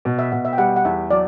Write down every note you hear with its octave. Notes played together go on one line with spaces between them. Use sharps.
B2
E5
B2 F#5
E5
G5
G3 F#5
F#5
E2 E5
F#3 D5